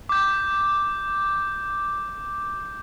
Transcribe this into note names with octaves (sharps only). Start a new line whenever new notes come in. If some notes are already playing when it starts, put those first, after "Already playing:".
D6 G6